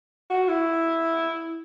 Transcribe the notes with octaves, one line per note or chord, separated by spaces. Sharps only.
F#4
E4